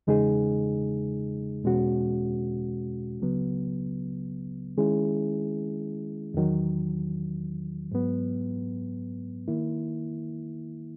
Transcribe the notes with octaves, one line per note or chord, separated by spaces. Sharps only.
E2 C#3 G#3 D#4 G#4
E2 B2 G#3 C#4 F#4
C#2 C#3 F#3 B3
D#3 G#3 C#4 E4 G#4
E2 D#3 F#3
G#2 F#3 B3
D#3 A#3 E4